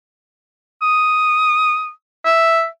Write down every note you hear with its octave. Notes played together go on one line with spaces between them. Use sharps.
D#6
E5